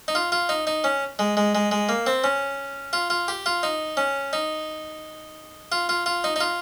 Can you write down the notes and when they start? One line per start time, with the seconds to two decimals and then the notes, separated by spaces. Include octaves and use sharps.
0.08 D#4
0.15 F4
0.32 F4
0.49 D#4
0.67 D#4
0.84 C#4
1.19 G#3
1.37 G#3
1.55 G#3
1.71 G#3
1.89 A#3
2.07 C4
2.24 C#4
2.93 F4
3.10 F4
3.28 G4
3.46 F4
3.63 D#4
3.97 C#4
4.33 D#4
5.72 F4
5.89 F4
6.06 F4
6.24 D#4
6.36 D#4
6.40 F4